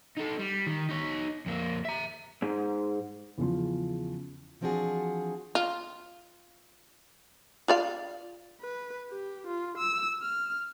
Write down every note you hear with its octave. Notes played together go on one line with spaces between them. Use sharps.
D#4 A4
G3
D#3
D#4 C#5
F2 A#3
E5 A#5
G#2
E2 C#3 F3
E3 F3 C4 D4 F#4 G#4
F4
F4 D5 F5
B4
G4
F4
E6
F6